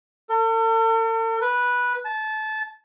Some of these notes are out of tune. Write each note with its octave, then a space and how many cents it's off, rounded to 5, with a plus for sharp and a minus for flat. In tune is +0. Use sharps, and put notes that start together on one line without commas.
A4 +45
B4 -10
A5 -25